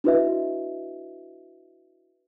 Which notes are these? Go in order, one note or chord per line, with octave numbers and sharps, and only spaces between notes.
D4 E4 F#4 B4 D#5 E5